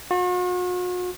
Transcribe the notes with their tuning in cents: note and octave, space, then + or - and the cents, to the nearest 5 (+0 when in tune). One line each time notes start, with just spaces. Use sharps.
F#4 -45